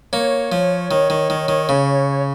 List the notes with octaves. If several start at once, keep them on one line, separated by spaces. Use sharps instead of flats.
A#3 C#5
F3
D#3
D#3
D#3
D#3
C#3